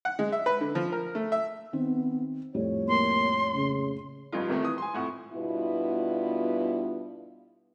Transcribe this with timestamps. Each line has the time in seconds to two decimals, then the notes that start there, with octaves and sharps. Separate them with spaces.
0.05 F#5
0.19 G#3
0.32 E5
0.46 B4
0.61 D3
0.75 F3
0.92 A#4
1.15 A3
1.32 E5
1.73 D#3 B3 C4
2.54 F2 A2 G3 C#5
2.89 A#3 C6
3.55 C#3
4.32 A1 G2 F3 D#4 F4
4.48 C2 C3 D#3 A3
4.62 E3 D#6
4.78 G#5 C6
4.93 F2 A2 F#5
5.33 G2 B2 B3 E4 F4